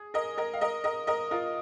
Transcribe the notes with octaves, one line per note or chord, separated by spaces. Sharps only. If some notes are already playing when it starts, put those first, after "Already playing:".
Already playing: G#4
A#4 D#5
A#4 D#5
F5
A#4 D#5
A#4 D#5
A#4 D#5
F4 A#4